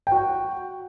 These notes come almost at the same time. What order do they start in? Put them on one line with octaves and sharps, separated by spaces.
G5 F#4 F#5